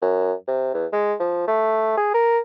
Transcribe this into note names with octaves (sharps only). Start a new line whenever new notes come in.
F#2
C3
E2
G#3
F3
A3
G#4
A#4